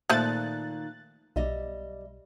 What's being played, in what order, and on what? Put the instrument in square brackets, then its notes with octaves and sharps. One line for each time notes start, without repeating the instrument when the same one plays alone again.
[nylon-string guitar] A#2 D#3 [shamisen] F3 A3 C5 [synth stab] F#6 A6
[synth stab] B1 [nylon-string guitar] G3 D#5 E5